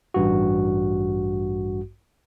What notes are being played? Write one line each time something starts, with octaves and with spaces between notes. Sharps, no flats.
A1 G2 F#4